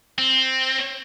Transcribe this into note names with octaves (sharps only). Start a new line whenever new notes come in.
C4